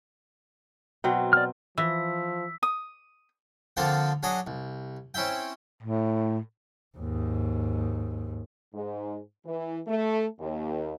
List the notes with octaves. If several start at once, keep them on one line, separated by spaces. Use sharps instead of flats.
B2 F#3 C4
D5 F6
E3 F3 E6 B6
D#6
D3 F3 A#3 C4 F4 A4
F#3 D4 G#4 D#5 A#5
C2
C4 C#4 E4 E5 G5
A2
D#2 G#2
G#2
E3
A3
D#2